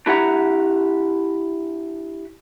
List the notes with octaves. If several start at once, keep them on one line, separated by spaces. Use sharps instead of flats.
D4 E4 G4 F#5 A#5